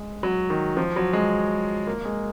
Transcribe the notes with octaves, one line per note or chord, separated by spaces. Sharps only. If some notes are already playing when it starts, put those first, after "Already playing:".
Already playing: G#3
F#3
D#3
F3
F#3
G#3
A#3
G#3